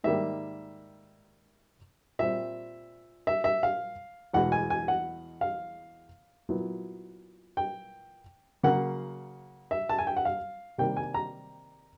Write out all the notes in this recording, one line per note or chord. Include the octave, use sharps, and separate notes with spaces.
G#2 D#3 G3 A#3 E5
A#2 G3 C4 E5
E5
E5
F5
E2 B2 G#3 F#5
G#5
G#5
F#5
F5
A#2 F#3 B3 E4
G5
C#3 F#3 A#3 F#5
E5
A5
G#5
G5
F#5
F5
C3 D#3 G3 A#3 G5
G#5
A#5